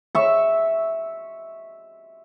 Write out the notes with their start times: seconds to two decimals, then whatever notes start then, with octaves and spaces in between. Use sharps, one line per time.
0.15 E5 C#6